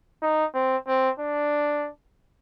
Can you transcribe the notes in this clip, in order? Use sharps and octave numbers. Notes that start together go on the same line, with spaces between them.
D#4
C4
C4
D4